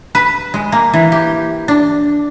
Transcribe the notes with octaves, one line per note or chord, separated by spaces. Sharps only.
B4
G#3
A#3
E3
G4
D4